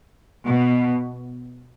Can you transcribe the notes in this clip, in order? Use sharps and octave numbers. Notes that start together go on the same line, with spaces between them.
B2